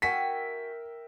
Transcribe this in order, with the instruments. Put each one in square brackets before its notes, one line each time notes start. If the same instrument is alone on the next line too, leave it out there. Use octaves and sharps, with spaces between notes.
[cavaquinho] F#4 G#5 [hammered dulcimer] A#4 E5 G5 [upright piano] B6